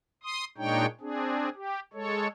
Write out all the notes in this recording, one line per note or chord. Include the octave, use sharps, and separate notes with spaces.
C6 D#6
A#2 G#3 D4 D#4 C#5 G5
C4 D4 G#4
G4
G#3 A4 C#5